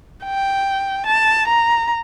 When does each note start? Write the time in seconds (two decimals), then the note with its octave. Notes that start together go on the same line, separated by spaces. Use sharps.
0.24 G5
1.06 A5
1.48 A#5